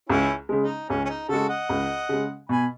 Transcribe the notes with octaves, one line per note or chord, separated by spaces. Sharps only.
C#2 C#4 E4
C#3 G#3
D#4
C#2 C#4
C#4
D#4
C#3 G#3 F#4 A4
D#5 F#5
C#2
C#3 G#3
B2 G#5 B5